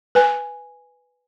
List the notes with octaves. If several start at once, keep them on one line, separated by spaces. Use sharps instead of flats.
B4 G#5